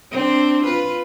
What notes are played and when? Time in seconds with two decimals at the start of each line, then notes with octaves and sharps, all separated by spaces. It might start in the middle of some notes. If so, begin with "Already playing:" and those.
0.12 C4 D4
0.64 F4 B4